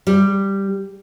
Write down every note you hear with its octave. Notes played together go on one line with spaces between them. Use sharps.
G3